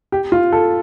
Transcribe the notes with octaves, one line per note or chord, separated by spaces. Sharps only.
G4
F4
A4